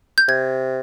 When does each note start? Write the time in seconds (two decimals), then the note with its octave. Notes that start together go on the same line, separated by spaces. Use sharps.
0.18 G6
0.28 C3 G#6